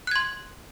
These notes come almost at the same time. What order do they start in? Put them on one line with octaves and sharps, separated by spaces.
F#6 G#6 C6